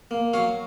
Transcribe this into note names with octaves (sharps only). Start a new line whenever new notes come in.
A#3
F#3 C#5 F5